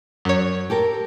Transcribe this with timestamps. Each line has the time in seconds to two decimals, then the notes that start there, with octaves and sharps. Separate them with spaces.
0.25 F#2 C#5
0.70 G4 A4 A#4